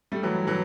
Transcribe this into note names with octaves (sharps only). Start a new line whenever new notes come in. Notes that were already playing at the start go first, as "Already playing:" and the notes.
G3 A3
E3 F#3
E3 F#3